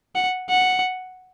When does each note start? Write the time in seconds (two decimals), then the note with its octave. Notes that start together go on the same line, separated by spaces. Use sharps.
0.15 F#5
0.50 F#5